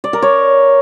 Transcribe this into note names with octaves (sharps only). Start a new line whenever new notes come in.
D5
A#4
C#5